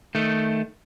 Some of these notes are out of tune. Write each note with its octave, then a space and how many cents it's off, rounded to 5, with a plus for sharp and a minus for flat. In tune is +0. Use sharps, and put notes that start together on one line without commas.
D#3 +0 A3 +0